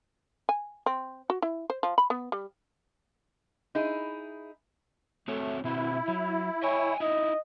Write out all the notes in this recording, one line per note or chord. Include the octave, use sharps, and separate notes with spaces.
G#5
C4
F#4
E4
C5
F3
B5
B3
G3
D#4 E4 G#4
A3 C4 F#4 C#5
B2 C4 E4 F#4
F#3
C#5 D#5 G5 G#5
D#4 E4 D#5